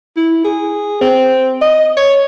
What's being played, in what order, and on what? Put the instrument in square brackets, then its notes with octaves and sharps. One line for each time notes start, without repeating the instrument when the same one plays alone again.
[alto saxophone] E4
G#4
C4
D#5
C#5